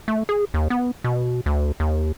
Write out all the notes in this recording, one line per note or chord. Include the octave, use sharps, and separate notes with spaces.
A3
G#4
D#2
B3
B2
D2
D#2